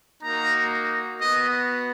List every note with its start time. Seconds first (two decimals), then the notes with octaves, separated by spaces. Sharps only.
0.22 A#3 D#4 F#4 A#5
1.19 B3 F#4 D#5